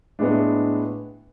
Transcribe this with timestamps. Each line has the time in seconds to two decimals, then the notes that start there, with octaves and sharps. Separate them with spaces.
0.19 A2 G#3 B3 D4